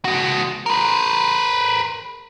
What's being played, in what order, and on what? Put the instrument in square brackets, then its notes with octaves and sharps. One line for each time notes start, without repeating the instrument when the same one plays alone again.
[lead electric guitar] G#3 F#4
A#4 B4